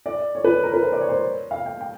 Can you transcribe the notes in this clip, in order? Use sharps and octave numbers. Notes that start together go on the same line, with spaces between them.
D5
C#5
B4
A#4
B4
C5
D5
C#5
C5
C#5
F5
G5
G5